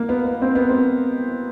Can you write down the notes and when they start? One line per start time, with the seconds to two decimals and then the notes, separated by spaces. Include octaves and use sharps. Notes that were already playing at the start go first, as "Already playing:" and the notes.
Already playing: A#3
0.09 B3
0.25 B3
0.42 C4
0.55 B3
0.69 C4